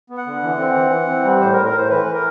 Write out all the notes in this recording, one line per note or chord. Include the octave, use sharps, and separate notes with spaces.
B3
F#5
D3
E3
C4
E3
E3
C4
G3
A2 C5
A#4
A2
A#4
A2 C5
E3 B4
E3
A#4